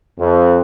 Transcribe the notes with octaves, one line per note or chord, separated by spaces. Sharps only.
F2